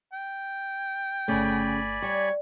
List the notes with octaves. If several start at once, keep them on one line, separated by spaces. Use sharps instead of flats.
G5
G1 C#3 A3 D5 G#5 B5
G3 C#5